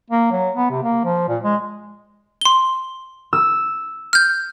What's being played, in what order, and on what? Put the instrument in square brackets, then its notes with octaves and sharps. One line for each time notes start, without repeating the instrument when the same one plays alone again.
[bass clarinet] A#3
F#3
B3
C3
A#3
F3
A#2
G#3
[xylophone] C6 G7
[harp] E6
[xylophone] F6 G6